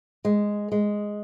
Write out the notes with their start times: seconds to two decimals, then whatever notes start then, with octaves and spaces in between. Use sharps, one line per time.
0.25 G#3
0.72 G#3